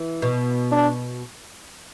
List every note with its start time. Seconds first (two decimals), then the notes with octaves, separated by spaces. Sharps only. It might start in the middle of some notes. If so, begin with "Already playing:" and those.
Already playing: E3
0.22 B2
0.72 D4